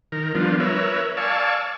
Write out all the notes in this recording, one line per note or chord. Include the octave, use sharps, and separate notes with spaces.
D#3 A#4
F3 G3 B3 D4 F4
A#4 B4 C#5 E5
D5 F5 G#5 A5 C#6 E6